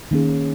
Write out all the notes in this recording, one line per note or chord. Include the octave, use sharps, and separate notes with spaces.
D#3 A#3 C#4 G#4